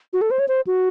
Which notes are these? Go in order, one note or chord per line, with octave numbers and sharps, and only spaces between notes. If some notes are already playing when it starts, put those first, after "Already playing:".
F#4
A4
C5
C#5
C5
F#4